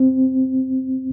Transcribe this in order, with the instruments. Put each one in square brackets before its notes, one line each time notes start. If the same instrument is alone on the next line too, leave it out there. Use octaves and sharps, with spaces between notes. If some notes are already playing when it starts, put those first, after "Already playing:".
Already playing: [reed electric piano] C4